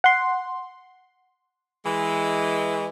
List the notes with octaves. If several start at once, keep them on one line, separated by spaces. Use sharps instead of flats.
F#5 C6
E3 G#3